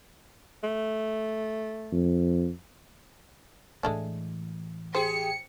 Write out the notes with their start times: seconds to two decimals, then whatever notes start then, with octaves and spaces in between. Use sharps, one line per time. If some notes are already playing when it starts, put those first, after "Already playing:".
0.64 A3
1.92 F2
3.83 A2 E3 G#3 A3 D4
4.95 G4 G#4 C5 C#7